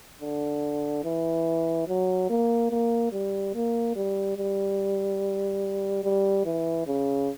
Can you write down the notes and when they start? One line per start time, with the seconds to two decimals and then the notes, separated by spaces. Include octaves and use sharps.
0.21 D3
1.04 E3
1.88 F#3
2.30 A#3
2.71 A#3
3.12 G3
3.55 A#3
3.96 G3
4.37 G3
6.04 G3
6.45 E3
6.86 C#3